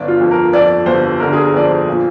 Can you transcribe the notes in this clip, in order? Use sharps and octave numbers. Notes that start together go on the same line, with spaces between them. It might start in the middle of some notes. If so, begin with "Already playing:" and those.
Already playing: G1 D5
F4
F2
A#4
F2 D5
G1 C5
D3 A#4
G#4
A#4
F2 D5
C5
A#2